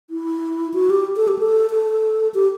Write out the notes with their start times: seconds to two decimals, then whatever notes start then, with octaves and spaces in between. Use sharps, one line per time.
0.10 E4
0.74 F#4
0.90 G4
1.16 A4
1.28 G4
1.39 A4
1.70 A4
2.34 G4